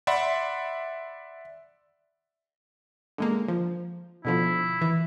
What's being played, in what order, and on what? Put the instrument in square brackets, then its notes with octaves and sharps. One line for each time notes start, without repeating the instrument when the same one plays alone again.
[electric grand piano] D5 E5 F#5 B5 C6
[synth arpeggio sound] D3 G#3 A#3
F3
[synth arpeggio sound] B2 D3 F3 [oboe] E4
[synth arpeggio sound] E3